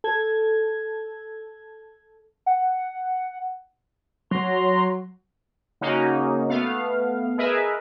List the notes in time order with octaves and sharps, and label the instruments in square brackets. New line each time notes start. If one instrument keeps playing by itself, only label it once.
[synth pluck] A4 G#6
[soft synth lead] F#5
[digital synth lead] F#3 [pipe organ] A#5 C6
[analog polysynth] C#3 A#3 C#4 D#4 F#4
A3 B3 F5
G#4 A#4 B4 D#5 E5